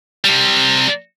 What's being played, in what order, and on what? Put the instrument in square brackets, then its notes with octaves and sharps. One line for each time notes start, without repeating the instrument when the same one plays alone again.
[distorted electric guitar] C3 G3